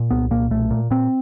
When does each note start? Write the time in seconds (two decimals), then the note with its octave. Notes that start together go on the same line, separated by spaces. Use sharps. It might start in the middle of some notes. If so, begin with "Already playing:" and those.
Already playing: A#2
0.10 C2 B3
0.31 A#2 A#3
0.50 B1 A3
0.71 A#2
0.91 A#2 C4